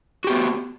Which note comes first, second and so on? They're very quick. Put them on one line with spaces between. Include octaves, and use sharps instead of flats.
F#4 G4 B3